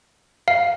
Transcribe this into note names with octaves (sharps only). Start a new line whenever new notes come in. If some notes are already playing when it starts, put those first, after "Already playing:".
F5